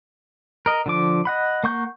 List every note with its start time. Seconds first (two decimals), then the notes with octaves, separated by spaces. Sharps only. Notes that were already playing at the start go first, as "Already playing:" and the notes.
0.66 A#4 D#5
0.86 D3 F3 D6
1.25 D#5 F#5 B5
1.64 A#3 F#5 C#6 G6